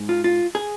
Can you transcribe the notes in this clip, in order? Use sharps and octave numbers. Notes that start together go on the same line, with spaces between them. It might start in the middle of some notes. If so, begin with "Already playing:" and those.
Already playing: G#2
F4
F4
G#4